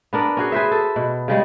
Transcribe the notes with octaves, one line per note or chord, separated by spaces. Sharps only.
B3 D4 A#4
C#4 F#4 G#4
G#4 B4 C5 E5
A4
B2
C#3 G3 G#3